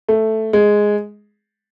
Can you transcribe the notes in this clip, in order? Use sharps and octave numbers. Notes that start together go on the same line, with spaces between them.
A3
G#3